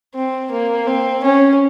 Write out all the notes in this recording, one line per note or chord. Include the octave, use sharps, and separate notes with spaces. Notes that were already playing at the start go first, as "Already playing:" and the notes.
C4
A#3
C4
C#4